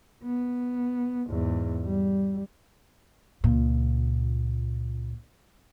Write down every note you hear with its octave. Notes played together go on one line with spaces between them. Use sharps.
B3
E2 G#2
G3
C#2 A#2